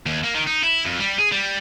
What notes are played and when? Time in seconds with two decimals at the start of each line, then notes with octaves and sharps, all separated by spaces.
0.06 D#2
0.24 A#3
0.35 D#3
0.47 D#4
0.63 E4
0.86 F2
1.00 G3
1.19 G#4
1.32 G3